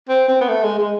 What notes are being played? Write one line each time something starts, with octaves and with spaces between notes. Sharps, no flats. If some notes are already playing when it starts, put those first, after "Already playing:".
C4
C4
B3
A3
G#3
G#3